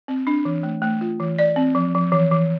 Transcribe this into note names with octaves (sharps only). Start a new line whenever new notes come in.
C4
D4
E3
A3
A3
F4
E3
D5
C4
F3
F3
E3
E3